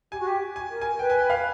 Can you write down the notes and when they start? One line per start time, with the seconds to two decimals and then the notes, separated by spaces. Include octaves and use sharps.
0.12 G4 G#5
0.19 F#4
0.27 G4
0.56 G#5
0.71 A#4
0.81 G#5
0.99 B4 G5
1.10 G#5
1.19 G5
1.30 F5